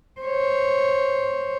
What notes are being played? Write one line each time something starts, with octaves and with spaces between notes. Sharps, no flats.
C5 C#5